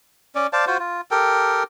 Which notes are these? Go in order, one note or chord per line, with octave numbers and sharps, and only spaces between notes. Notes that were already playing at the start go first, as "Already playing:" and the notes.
C#4 D5
C5 D5 F5 A5
F4 F#4 C5
F4
G4 A4 A#4 G5